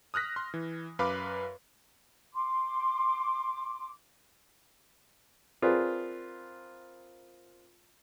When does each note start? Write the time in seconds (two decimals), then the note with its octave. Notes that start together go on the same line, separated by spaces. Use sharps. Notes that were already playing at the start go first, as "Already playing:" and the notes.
0.14 D#6 F6 F#6 A#6 B6
0.36 C6
0.54 E3
0.99 F#2 B4 F5 B5 D6
2.33 C6 D6
5.62 C4 F4 G#4 A#4 B4 D5